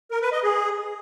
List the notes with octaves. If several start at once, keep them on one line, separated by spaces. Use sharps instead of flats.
A#4
B4
D#5
G#4